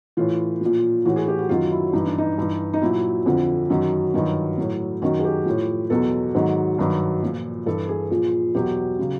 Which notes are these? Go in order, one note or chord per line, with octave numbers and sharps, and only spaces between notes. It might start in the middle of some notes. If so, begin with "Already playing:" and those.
A2 E3 F4
A#2 F3
A2 E3 F#4
G#4
G4
F#4
F#2 D#3 F#3 F4
E4
G2 E3 D#4
D4
D#4
G2 E3
D#4
A#2 F#3 E4
F2 D3 F3
F#2 D#3 F#3
G2 D#3 F#3 F4
A2 F#3
F#2 D#3 F#3 F#4
G#4
G4
A2 F3
E2 B2 F#3 A4
G#2 D#3 F#3
G2 D#3 F#3
A#2 F3
G2 E3 A4
G#4
A#2 F3
E2 B2 F#3 G4
C#3 F#3